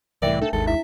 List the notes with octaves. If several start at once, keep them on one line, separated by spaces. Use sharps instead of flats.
C2 A2 E3 A#4 D5 E5 G5
A3 D4 A4
G#1 D#2 D#3 G#3 A4
E4 E5